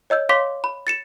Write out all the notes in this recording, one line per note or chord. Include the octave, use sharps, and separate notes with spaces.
C#5 D#5 E6 G6
C#5 F5 C6 D6 B6
B5
A6 C#7 E7